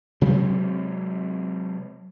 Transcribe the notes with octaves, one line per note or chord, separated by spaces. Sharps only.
C3 F#3 G#3 C4